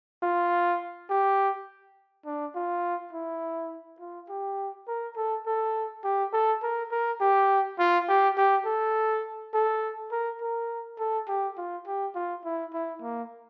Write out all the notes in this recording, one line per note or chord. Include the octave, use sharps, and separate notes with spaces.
F4
G4
D4
F4
E4
F4
G4
A#4
A4
A4
G4
A4
A#4
A#4
G4
F4
G4
G4
A4
A4
A#4
A#4
A4
G4
F4
G4
F4
E4
E4
A#3